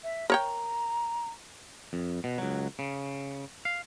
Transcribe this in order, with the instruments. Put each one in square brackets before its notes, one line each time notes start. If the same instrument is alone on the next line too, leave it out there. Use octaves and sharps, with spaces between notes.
[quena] E5
[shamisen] A#4 C#5 G5 [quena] A#5
[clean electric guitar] F2
B2
C#2 F#3
C#3
F5